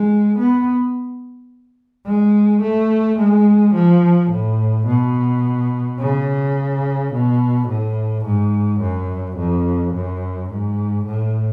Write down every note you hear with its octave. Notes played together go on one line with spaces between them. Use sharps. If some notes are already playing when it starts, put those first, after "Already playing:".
Already playing: G#3
B3
G#3
A3
G#3
F3
A2
B2
C#3
B2
A2
G#2
F#2
F2
F#2
G#2
A2